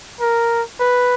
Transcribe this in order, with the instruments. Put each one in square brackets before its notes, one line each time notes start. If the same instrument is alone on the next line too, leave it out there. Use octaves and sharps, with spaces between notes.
[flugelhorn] A#4
B4